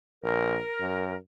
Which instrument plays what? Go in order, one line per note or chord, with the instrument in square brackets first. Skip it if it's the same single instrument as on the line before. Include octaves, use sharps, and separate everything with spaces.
[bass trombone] A#1 [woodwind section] A#4
[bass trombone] F#2